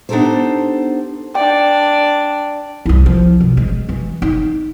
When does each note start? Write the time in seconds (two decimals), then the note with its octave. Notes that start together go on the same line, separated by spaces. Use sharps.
0.09 B3 D4 D#4 G4 A4 C5
1.35 D4 D5 G5
2.86 C2 E4
3.06 F3
3.40 B2
3.57 G#3
3.89 E3
4.22 D#4